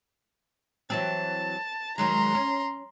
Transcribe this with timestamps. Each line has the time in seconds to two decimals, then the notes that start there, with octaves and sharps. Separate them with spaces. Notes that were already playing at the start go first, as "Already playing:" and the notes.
0.90 E3 F#3 C4 A5
1.98 D#3 F#3 G#3 A#5 C6
2.35 C#4